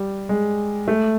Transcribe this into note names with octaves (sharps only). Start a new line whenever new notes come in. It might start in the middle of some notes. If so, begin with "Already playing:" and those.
Already playing: G3
G#3
A3